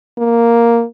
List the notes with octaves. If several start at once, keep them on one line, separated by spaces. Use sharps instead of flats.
A#3